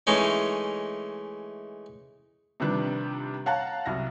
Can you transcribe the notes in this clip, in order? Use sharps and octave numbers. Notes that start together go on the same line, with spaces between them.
E3 G#3 A3 C#4 D#4
C3 D#3 F3 G3 D4 B4
C#5 F5 F#5 A5 A#5 F#6
C2 F#3 E4 F6 A#6